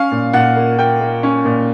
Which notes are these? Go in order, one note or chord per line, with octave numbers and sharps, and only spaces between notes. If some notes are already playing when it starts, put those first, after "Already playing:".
Already playing: C#4 F5
A#2
A#2 F#5
A#3
A#3 G5
A#3
C#4
A#2